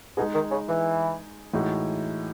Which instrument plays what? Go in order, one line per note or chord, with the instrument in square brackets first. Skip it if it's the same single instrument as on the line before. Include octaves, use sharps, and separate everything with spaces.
[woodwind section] B2 [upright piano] G#3 D#4 G#4
[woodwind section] D#3
C#3
E3
[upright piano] A2 E3 G#3 D#4 F#4